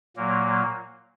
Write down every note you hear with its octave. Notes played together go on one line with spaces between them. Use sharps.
A#2 F#3 A#3